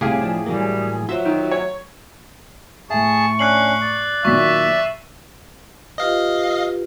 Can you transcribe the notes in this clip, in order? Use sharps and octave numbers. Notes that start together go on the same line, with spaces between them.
C2 A2 C3 G4 G#4 F5
F3 D4
E3 F#3 G3 A#3
F#3 F4 F#4 C5 E5
D#3
C#5
A2 G#4 E5 A5 C#6
C#4 D4 F#6 C7 F#7
D5
A#2 D#3 F#3 E5 C#6 B6
F4 G4 B4 D#5 F5